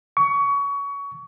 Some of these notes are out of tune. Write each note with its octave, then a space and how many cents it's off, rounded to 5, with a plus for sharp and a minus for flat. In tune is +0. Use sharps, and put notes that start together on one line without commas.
C#6 +25